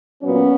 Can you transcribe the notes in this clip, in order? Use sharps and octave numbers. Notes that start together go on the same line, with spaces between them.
A#2 F#3 B3 C#4